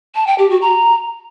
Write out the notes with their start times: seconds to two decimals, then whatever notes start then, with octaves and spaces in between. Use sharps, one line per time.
0.15 A5
0.27 G5
0.38 G4
0.50 F#4
0.62 A#5